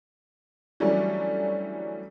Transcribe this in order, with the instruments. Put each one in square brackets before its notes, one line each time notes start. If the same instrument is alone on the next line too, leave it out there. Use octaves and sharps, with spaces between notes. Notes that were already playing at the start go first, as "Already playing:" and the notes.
[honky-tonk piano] E3 F#3 G3 A3 C#4 D4